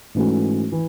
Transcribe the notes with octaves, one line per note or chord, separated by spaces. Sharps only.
G#2 E3 A3 C#4 F#4
E3